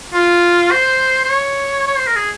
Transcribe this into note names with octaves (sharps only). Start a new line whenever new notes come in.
F4
C5
C5
C#5
C#5
C5
A#4
G#4